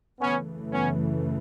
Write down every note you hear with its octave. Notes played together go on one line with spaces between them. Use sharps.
F#2 C#3 E3 A3 B3 C#4
B3 C#4